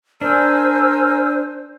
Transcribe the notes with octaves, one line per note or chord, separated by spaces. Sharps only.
D4 A#4 C5 G#5 E6